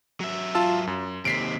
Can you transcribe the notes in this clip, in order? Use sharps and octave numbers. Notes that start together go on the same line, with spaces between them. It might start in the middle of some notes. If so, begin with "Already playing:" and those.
F#3 E5
F4 A5 E6
F#2
D#2 C3 B6 C7 D7